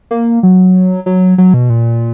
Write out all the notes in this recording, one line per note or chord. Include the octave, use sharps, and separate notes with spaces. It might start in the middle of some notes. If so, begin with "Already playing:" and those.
A#3
F#3
F#3
F#3
B2
A#2